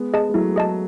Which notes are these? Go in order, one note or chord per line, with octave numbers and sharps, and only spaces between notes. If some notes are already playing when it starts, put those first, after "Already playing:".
Already playing: G#3 B3
G#4 D#5 A5
G#3
F#3 A3 E4
G#4 D#5 A5